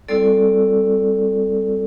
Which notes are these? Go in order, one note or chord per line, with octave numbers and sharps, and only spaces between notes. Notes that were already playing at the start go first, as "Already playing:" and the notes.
G3 C4 E4 A4 D5